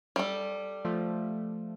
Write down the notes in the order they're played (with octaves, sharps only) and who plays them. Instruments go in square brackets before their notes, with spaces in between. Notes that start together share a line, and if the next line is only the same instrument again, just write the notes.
[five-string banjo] G3 A4
[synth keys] F3 A3